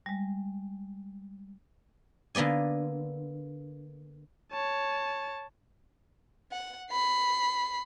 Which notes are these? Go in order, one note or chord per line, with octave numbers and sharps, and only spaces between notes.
G3 G#3
D3 A#3 B3 D5 G#5
C#5 A5
F#5
B5 C7